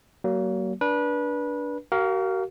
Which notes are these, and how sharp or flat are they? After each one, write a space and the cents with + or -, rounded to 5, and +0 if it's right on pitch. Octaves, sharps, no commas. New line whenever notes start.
F#3 +35 A#3 +0
D4 -10 B4 -25
F#4 +40 A#4 -5 F5 +0